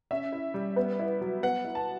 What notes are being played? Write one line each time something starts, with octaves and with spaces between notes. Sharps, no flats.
C#4 E5
E4
G3
B3
E4
F#3
B3 F#5
E4
A5